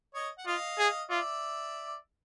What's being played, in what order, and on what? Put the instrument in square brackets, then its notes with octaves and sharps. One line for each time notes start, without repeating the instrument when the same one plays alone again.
[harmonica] C#5 D#5
F#5
[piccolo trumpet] F4 [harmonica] D#5 F5
[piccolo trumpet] G#4
[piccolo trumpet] F4 [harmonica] D5 E5